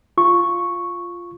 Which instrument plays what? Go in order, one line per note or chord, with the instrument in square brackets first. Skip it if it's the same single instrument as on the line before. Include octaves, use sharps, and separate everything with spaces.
[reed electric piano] F4 C#6